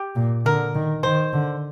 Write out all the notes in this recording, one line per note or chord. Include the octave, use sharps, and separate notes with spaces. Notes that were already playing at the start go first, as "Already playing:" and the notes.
Already playing: G4
A#2
D3 A#4
D#3
D#3 C5
D3